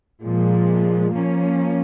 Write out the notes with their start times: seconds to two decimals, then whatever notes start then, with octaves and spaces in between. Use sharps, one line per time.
0.25 A#2 F3 G#3
1.13 F3 A#3 C#4